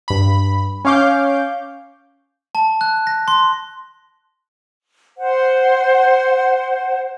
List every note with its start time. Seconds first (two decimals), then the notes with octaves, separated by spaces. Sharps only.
0.08 G2 B5
0.85 C#4 C#5 F5 D6 G6
2.55 A5
2.81 F#6
3.07 A#6
3.28 C6
5.18 C5 F#5